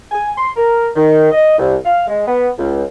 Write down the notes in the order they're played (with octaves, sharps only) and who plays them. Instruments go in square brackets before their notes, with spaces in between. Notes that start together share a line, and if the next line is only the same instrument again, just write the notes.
[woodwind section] G#5
C6
A#4
D#3
D#5
C2
F5
G#3
B3
C#2